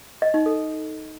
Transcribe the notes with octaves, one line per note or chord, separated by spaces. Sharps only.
D#5
D#4
A4